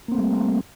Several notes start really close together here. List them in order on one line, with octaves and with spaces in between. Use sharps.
A#3 C4 A3 G3